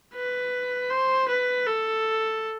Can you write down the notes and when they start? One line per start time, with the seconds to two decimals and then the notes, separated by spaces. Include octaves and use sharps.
0.15 B4
0.90 C5
1.29 B4
1.66 A4